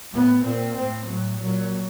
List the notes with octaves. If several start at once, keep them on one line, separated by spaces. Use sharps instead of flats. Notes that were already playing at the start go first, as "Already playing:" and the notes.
A2 B3
A#2 C4
A2 C4
A2 F#3
A#2 F#3